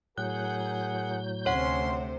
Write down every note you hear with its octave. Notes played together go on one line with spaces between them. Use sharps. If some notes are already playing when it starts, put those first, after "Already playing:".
A2 F#3 G#4 A#4 F#5 F#6 G6
D2 C3 C#4 C5 C#5 F#5 C6